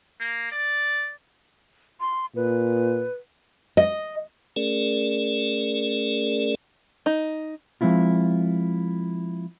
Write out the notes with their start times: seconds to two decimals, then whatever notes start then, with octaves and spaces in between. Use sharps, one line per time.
0.20 A#3
0.52 D5
2.00 C6
2.36 A#2 B4
3.77 D#5
4.56 A3 C#4 G#4 A#4 D5
7.06 D#4
7.81 F3 G#3 C4 E4 F4